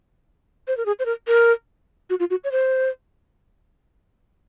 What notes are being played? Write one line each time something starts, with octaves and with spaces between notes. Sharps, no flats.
C5
A#4
G#4
C5
A#4
A#4
F#4
F4
F#4
C#5
C5